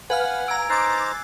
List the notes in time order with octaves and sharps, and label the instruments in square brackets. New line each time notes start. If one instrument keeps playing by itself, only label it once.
[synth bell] B4 F5 F6 [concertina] F#5 [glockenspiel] G#5 G#6
[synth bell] A#5 D7 [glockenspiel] E6 G#6
[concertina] D#4 C5 A#5 [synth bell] D6 A6 [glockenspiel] E6 F#6 C7